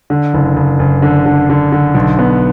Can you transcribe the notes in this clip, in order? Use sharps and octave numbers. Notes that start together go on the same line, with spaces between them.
D3
F#1
F#1
F#1
D3
D3
D3
D3
B1
B3